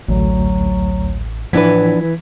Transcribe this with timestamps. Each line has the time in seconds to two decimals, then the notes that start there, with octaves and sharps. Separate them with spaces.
0.09 A1 D2 F#3
1.53 A2 E3 F3 B3 D4 B4 G#6 B6